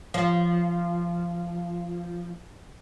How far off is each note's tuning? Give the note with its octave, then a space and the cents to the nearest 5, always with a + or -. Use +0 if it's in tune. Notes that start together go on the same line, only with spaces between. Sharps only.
F3 -15